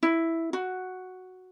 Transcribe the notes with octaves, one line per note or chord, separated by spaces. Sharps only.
E4
F#4